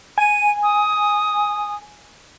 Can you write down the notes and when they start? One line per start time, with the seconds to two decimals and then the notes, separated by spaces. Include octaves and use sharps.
0.18 G#5 D#7
0.63 D#6